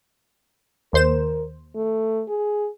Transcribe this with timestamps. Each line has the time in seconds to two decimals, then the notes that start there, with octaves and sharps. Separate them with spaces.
0.93 D#2 A#4 C5 E7
1.76 A3
2.28 G#4